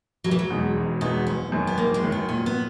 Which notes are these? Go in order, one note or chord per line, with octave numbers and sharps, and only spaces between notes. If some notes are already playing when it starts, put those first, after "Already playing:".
E1 F#3
E3
F#3
E2 B2 G#3 D#4
E1
E2 B2 G#3 B3 D#4
F#1 C#4
F#2 D#3
B3
F#1 A#3
G#3
F#2 D#3
B3
A#2 C#4
B3